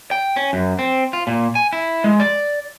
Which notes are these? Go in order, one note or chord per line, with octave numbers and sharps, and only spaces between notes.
G5
C#4
F#2
C4
F4
A#2
G#5
E4
G#3
D5